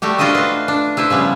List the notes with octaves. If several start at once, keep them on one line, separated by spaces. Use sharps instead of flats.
G3 A3 F#4 G4
D4 F4 F#4 C5 D#5 E5
B4 F5
D4
E4 B4 C5 E5
C#3 F3 G3 B3